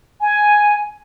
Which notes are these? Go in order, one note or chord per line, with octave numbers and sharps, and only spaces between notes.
G#5